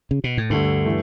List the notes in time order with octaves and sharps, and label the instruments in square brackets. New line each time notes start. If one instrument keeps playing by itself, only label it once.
[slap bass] C#3
B2
A2
[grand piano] D2 D3 A3 [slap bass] G2
[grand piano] E3 A3